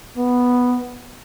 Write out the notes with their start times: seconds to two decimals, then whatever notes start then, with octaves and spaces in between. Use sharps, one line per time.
0.17 B3